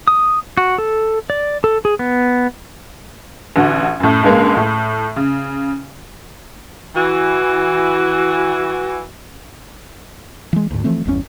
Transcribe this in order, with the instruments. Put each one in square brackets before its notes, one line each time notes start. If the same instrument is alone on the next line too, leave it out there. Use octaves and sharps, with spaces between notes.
[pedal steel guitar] D#6
F#4
A4
D5
A4
G#4
B3
[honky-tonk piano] A1 D3 F#4
F#2 A2
C#2 G2 G#3 A#3
A2
C#3
[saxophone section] E3 F#4
[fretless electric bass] E3 G#3
D2 G#2
E3 F3 A3 C4
G1 E2 C#3 C#4